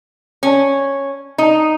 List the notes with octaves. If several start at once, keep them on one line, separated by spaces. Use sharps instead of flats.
C#4
D#4